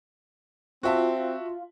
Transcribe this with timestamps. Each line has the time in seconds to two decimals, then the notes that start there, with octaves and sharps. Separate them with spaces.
0.83 C4 F4 F#4 E5 A5